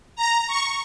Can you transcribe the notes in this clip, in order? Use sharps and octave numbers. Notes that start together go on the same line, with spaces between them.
A#5
C#6